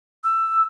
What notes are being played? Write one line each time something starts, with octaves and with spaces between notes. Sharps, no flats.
E6